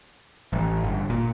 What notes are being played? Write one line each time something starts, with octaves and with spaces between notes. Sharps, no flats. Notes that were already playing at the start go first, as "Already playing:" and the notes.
A1
G1
A#2